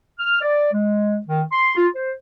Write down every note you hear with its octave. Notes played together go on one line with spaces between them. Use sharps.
F6
D5
G#3
D#3
C6
F4
C5